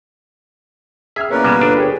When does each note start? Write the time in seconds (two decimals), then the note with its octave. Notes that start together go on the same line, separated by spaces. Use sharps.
1.16 G#4 E5 F6
1.31 A#3 C#4 E4 A#4 B4 D5
1.44 B2 G3 G#3
1.61 G1 D4
1.76 G4 G#4 C#5